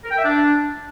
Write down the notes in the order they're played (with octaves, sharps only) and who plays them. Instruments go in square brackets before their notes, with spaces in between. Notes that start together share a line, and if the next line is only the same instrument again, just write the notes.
[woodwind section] A#4
G5
E5
D4